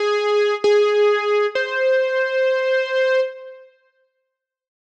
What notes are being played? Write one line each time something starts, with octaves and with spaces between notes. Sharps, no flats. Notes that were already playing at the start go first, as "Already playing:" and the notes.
Already playing: G#4
G#4
C5